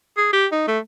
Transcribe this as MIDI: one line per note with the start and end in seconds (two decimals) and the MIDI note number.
0.17 0.28 68
0.33 0.47 67
0.52 0.64 63
0.68 0.79 57